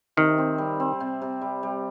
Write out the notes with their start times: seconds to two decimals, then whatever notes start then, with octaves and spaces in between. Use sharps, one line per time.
0.17 C3 D#3
0.38 C4
0.58 G3
0.80 C4
1.00 C3
1.21 C3
1.41 G3
1.63 G3